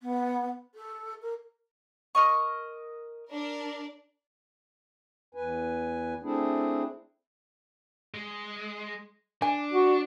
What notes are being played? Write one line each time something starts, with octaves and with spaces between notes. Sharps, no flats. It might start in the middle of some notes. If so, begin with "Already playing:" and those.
B3
A4
A#4
A#4 D#5 C#6
D4 A#4 D5
E2 B4 G#5
A3 C4 D4 E4 G#4
G#3
D4 G#5
F#4